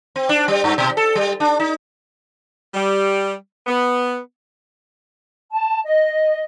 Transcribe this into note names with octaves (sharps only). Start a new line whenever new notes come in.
C4
D4
G3
G2
B2
A4
G3
D4
D#4
G3
B3
A5
D#5